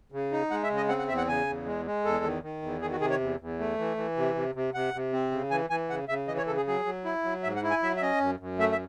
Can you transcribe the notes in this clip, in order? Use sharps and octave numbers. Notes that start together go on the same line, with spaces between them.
C#3
D#4
G#3 F#5
E5
C#3
D#5
C4 F#5
F#5
E2 E5
F#5
C#3 G#5
E2
G#3
G#3
E2 A4
D#3
D#3
E2
D#3 G#4
F#4
C3 G#4
C#5
E2
E2
A3
E3
E3
C3
C3
C3
C3 F#5
C3
C4
C#3
E3 G#5
E3 G#5
C#3 F#5
C#3 E5
E3 D#5
C#5
C#3 A4
G#4
F#3 G#4
F#3
E4
F#3
G#2 E5
F#5
E4
G#5
F#3 E5
E5
C#4 D#5
F#2
F#2
A3 E5
E5